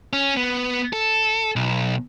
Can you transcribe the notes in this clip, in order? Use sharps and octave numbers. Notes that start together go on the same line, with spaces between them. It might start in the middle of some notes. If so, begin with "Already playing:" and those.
C#4
B3
A4
B1